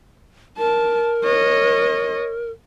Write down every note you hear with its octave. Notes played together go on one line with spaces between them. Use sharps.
A#4 A5
C#5 D#5